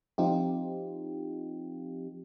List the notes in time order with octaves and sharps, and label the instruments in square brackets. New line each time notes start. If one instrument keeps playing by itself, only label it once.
[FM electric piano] F3 C4 D#4 F4 G4